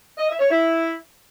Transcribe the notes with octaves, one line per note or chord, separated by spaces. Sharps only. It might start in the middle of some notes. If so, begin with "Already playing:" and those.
D#5
E5
C#5
E4